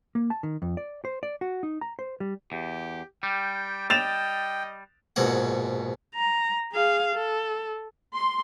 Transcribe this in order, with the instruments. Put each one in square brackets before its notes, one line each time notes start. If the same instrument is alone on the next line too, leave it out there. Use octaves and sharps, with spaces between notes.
[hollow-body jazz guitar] A#3
A5
D#3
F2
D5
C5
D5
F#4
D#4
A#5
C5
G3
[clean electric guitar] E2 [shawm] G4
[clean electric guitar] G3 [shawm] G5
[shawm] D#5 [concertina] G5 [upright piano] A6 E7 F7
[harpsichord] A#1 G#2 B2 C#5 F#5
[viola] A#5
G#4 F5
A4
[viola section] C6